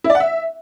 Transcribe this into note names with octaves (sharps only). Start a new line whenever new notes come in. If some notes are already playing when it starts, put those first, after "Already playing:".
E4
D5
F#5
E5